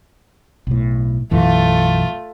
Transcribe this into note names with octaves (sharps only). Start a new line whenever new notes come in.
B1 A2
B1 F#2 E3 A3 F4